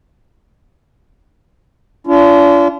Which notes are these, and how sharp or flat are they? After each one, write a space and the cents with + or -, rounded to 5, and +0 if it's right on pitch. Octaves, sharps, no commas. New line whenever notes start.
D4 -40 F4 -35